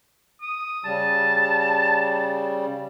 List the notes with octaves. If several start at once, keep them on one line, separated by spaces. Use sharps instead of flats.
D#6
C#3 G3 A5